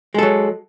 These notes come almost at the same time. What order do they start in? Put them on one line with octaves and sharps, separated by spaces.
G#3 A4 F#3